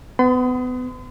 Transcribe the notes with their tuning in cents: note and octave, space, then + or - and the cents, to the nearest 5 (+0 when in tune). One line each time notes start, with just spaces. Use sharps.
B3 +30 C6 -45